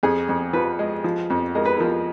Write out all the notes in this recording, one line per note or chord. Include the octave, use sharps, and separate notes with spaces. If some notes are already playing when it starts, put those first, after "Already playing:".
F2 G#4
F2
F3 B4
G#3
F3
F2
G#3 A#4
B4
F3 A#4